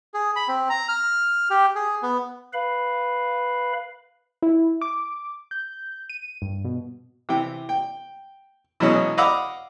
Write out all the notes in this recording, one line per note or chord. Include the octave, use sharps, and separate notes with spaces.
G#4
B5
C4
A#5
F6
G4
G#4
B3
B4 F5 B5
E4
D6
G6
D#7
G2
B2
C3 E3 G5
G5
B2 E3 F#3 G#3 C#4
D#5 F5 F#5 B5 D6 E6